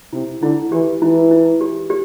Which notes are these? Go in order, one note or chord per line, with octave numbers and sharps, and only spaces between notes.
C3 E4
D3 E4
E3 G4
E3 E4
E4
G4
G4